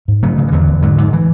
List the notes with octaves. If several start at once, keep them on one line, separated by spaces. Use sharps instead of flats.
G#2
C#3 F#3 A3
C#3
E3
E2 D3 F#3
E2
G#2 D3 F#3
G#2
E3